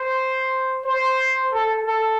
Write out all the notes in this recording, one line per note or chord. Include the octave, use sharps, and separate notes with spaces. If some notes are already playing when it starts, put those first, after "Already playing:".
Already playing: C5
C5
A4
A4